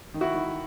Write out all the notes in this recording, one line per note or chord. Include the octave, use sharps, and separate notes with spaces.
D#3
E4 F#4
D#3